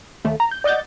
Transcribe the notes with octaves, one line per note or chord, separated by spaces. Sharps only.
D#2 A3
A#5
G6
D5 D#5 F#5 G6 A6